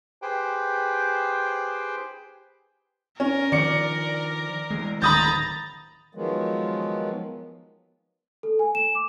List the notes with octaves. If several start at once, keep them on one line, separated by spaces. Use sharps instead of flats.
G4 G#4 B4 C5 G5
C#4 A#4
D#3 F3 D5 C#7
E3 G#3
D1 D#3 A#5 B5 D#6 G6 A6
D#3 F3 F#3 G#3 B3
A4
G#5
E7
D6